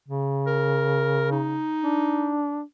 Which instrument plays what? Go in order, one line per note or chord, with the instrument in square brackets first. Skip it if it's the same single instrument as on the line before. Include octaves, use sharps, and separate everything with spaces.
[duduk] C#3
[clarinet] A#4
D#4
[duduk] D4